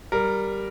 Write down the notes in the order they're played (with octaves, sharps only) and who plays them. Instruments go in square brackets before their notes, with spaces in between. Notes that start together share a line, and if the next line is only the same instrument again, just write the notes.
[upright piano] G3 [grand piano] A#4